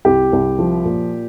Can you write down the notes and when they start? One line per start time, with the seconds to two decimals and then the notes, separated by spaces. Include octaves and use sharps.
0.05 C2 G4
0.33 C2
0.59 F3
0.85 A#2